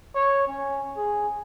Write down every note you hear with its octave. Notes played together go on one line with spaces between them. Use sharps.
C#5
C#4
G#4